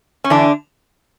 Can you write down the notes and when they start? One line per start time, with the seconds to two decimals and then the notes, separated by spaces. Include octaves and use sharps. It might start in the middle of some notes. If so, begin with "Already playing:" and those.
0.24 C#4
0.30 D3 E3 D4